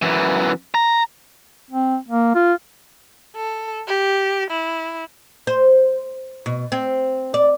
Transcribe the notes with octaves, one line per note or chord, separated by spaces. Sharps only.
F#2 E3
A#5
C4
A#3
F4
A4
G4
E4
C5
B2
C4
D5